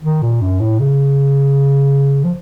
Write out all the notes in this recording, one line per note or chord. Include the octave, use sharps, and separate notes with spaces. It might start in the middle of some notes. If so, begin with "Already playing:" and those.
D#3
A#2
F#2
A2
C#3
F3